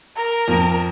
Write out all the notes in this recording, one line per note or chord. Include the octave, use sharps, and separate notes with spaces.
A#4
F2